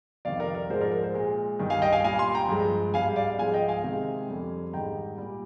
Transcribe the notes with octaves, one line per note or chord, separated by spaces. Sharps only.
F2 C3 D#3 G3 D5 F5
A#4 D5
A#4
G#2 F3 G#3 C5
A#4 D5
A#4
C5
A#2 G#3
G2 D#3 G3
F5 G#5
D#5 G5
F5 G#5
A#2 G3 F5 G#5
G#5 C6
G5 A#5
G2 F3 G#3
G#2 G3 F5 G#5
D5 F5
G#2 F3 G#3 F5 G#5
D#5 G5
F5 G#5
C3 D#3 G#3
F2 D3 G3
G#2 D#3 G3 G5 A#5
A#2 G3